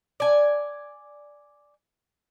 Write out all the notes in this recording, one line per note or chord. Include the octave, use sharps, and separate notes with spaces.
D5 G#5